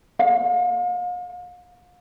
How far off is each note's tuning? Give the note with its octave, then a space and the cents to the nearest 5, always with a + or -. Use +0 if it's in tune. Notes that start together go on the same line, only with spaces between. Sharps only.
F5 +40